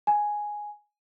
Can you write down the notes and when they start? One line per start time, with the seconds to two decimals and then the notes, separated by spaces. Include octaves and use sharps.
0.07 G#5